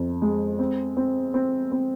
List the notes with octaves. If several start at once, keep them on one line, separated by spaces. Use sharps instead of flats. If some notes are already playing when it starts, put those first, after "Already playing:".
Already playing: F2
G#3
C4
C4
C4
C4